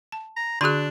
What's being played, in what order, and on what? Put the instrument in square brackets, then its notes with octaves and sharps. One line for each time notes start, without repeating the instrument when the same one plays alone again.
[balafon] A5
[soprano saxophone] A#5
[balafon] D3 F#4 G#4 [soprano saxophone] D4 [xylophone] C6 F#6